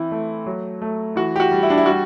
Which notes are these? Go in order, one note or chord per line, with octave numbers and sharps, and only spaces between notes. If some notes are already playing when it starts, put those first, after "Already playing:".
Already playing: E3 C4 E4
A3
F#3
A3
E3 F#4
G4
F#4
G3
E4
D4
E4
G3 F#4